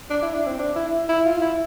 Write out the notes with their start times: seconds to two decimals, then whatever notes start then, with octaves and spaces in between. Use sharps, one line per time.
0.10 D4
0.23 E4
0.34 D4
0.47 C4
0.59 D4
0.76 E4
1.09 E4
1.26 F4
1.42 E4